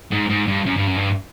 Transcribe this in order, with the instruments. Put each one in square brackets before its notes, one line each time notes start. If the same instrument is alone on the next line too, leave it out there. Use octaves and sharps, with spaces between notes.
[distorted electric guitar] G#2
G#2
G2
F#2
G2
F#2
G2